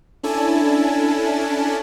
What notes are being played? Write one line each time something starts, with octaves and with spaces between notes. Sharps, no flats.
C#4 D4 E4 A4 G#5 A5